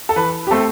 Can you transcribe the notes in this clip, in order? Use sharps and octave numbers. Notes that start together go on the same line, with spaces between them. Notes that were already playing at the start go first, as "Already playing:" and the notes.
A4
E3 B4
G4
A3 C4 A4